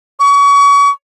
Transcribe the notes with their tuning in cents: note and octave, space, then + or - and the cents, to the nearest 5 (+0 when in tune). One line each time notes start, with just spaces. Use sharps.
C#6 +35